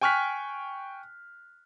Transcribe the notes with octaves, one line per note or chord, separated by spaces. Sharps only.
G5 G#5 C#6 F6 F#6 B6